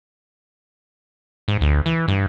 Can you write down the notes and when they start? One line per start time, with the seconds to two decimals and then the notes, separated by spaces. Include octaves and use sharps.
1.48 G#2
1.61 D2
1.86 E3
2.08 G2